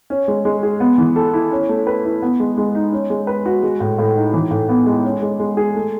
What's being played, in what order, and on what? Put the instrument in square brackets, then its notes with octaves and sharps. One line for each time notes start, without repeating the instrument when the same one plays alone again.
[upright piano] C#4
G#3
G#3
G#4
B3
E3
A4
E4
C#4
A3
B4
E4
B3
G#3
G#3
D#4
C#4
G#3
B4
F#4
G#3
A2
A2
D#4
E3
A2
B3
G#3
C#4
G#3
G#3
G#4
A3